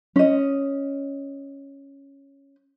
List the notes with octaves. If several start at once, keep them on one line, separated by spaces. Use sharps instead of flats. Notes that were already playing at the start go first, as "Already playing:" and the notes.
C#4 D#5